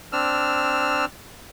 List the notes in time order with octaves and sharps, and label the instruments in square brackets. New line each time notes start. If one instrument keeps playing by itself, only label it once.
[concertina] C4 D4 E6 F6